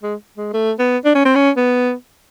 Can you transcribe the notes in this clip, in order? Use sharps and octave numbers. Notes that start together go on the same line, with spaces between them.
G#3
G#3
A3
B3
D4
C#4
C4
C#4
B3